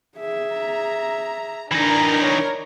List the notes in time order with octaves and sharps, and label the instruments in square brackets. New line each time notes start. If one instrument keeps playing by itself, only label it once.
[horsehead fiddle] G#4 E5
[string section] A#5
[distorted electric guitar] E3 D#4 [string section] D4 A#4
[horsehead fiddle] C#5